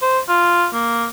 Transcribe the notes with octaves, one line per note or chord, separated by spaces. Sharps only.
C5
F4
A#3